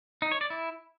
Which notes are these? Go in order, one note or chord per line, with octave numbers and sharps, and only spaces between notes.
D#4
C#5
D5
E4